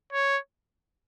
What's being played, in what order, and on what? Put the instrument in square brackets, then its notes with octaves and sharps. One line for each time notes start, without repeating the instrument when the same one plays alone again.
[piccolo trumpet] C#5